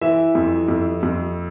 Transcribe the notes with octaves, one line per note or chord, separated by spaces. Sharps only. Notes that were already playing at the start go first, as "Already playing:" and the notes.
E3 E5
F2
F2
F2